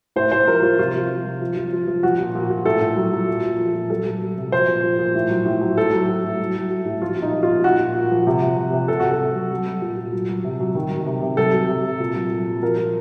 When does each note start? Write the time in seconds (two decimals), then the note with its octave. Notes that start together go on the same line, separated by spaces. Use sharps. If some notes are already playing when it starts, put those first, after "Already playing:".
0.16 A2 C5
0.32 A2 C5
0.47 F3 A#4
0.63 F3 F4
0.79 C3 F4
0.94 F3
1.10 F3
1.25 C3
1.41 F3
1.57 F3
1.73 F3
1.87 F3
2.03 F3 F#4
2.19 A#2
2.35 A#2
2.50 A#2
2.65 A2 A4
2.81 A2
2.96 F#3
3.12 F#3
3.28 A#2
3.44 A#2
3.59 F3
3.75 A#2
3.90 F#3 A4
4.05 F#3
4.22 F#3
4.38 C3
4.52 F3 C5
4.68 A#2
4.84 F3
4.99 A#2
5.15 A2
5.30 F#3
5.46 A2
5.61 F#3
5.77 A2 A4
5.93 F#3
6.08 F#3
6.24 A2
6.40 F#3
6.55 F#3
6.70 F#3
6.86 A2
7.02 F3 F4
7.17 A#2
7.22 D#4
7.33 F3
7.43 F4
7.48 A#2
7.64 A#2 F#4
7.79 A#2
7.95 A#2
8.11 F3
8.27 C3
8.42 C3
8.57 C3
8.73 C3
8.88 C3 A4
8.99 C3 F#4
9.11 A4
9.20 C3
9.35 F#3
9.51 F#3
9.67 F#3
9.82 A#2
9.97 A#2
10.13 F#3
10.29 F#3
10.44 C3
10.60 F#3
10.75 D#3
10.91 D#3
11.06 C3
11.22 C3
11.37 F#3 A4
11.54 F#3
11.68 C3
11.85 C3
12.00 A#2
12.15 F#3
12.31 F#3
12.46 A#2
12.63 F3 A#4
12.78 F3